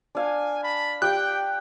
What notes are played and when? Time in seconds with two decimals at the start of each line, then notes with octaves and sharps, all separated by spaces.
0.15 D4 F5 G#5
0.63 A5 B5
1.02 G4 F5 G5 F#6